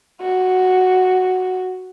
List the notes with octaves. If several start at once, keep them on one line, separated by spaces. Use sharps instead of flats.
F#4